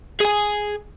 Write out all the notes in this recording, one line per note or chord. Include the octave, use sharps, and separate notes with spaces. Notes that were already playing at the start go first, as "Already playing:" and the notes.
G#4 G#5